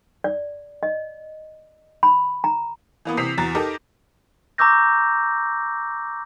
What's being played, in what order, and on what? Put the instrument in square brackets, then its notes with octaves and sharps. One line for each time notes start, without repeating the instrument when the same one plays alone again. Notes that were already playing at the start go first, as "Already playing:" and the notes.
[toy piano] D5
D#5
B5
A#5
[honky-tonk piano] E3 A#3 B3
C3 E3 D#6 B6 C7 F7
E2 F#4 A#5 A6
D#4 G4 A4 A#4 D6
[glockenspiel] A#5 C#6 D6 E6 G6 A#6